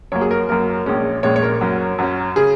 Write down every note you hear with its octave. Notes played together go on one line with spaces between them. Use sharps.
F#2 F#3 A#3 C#5
G#4
A#4
F#2 F#3 A#3 A#4
A#1 A#2 G#3 C#4
A#1 A#2 G#3 C#4 C#5
C#5
A#4
F#2 F#3 C#4
F#2 F#3 C#4
C#3 G#4